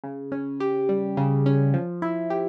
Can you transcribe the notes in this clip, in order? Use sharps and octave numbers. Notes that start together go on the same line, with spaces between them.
C#3
C#4
G4
G3
C#3
C#4
F3
E4
G4